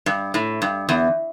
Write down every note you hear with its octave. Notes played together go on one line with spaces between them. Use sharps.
G2
A2
G2
E2